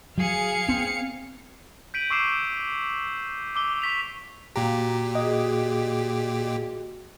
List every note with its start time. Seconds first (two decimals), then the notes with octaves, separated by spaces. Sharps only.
0.18 F#3 G#4 F5 C#7
0.69 B3 C4
1.94 G6 B6 D7 D#7 F#7
2.10 C#6 D6 E6 C7 E7
3.56 D6 E6 G7
3.82 C#6 B6 F7
4.56 A#2 F#4 G4 F5 A#5
5.15 F#4 G#4 D#5